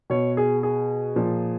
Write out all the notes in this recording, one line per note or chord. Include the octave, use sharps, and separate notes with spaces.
B2 C#5
G#4
G#4
A#2 F3